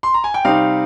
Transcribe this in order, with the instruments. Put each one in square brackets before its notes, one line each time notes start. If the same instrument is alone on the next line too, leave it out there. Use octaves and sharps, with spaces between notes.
[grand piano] C6
A#5
G#5
G5
[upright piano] C3 G3 C4 D#4 [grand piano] F5